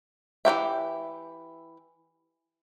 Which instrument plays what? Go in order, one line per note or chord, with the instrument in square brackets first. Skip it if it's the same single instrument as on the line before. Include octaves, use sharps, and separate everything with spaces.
[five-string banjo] E3 F#3 G4 E5